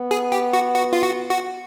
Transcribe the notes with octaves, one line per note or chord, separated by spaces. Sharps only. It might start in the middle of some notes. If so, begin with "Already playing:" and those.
Already playing: B3
G#4
G4
F#4
F#4
F4
F#4
F#4